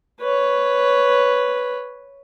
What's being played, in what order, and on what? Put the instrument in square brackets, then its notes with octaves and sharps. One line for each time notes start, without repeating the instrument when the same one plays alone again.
[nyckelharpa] B4 C#5